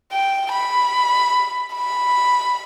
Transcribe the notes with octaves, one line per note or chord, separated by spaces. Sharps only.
G5
B5
B5